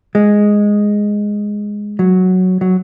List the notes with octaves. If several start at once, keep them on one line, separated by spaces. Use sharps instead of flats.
G#3
F#3
F#3